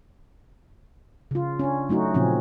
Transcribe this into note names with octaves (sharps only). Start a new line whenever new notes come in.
C#3 F4
C#4 D4
F#3 A3 D#4 F#4
A#2 C#3 F3 C4 C#4